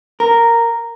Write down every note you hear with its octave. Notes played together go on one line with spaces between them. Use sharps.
A#4